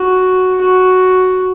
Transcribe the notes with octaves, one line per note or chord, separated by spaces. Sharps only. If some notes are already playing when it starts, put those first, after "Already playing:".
Already playing: F#4
F#4